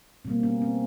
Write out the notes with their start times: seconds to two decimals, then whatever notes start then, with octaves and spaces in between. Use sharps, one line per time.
0.25 B2 G3 A#3 C4
0.43 B3 C#4
0.62 C4